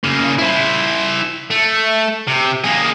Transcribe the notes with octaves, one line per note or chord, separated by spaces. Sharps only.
C#3 A#3
E4 C5
A3
C3
A#3 G#4